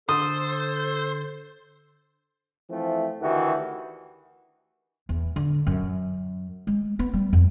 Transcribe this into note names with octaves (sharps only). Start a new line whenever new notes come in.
D3 A4 C5 D#6
E3 F3 A3 C4
D2 D#3 E3 F#4 G4
E2
D3
F#2
G#3
B3
G3
F2